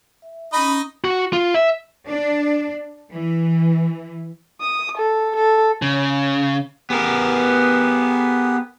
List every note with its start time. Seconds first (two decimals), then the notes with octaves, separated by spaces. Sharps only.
0.22 E5
0.53 C#4 D#4 D#5 B5 D#6
1.04 F#4
1.33 F4
1.54 E5
2.06 D4
3.11 E3
4.61 D#6
4.98 A4
5.36 A4
5.82 C#3
6.90 B3 G4 G#4 A#4 B4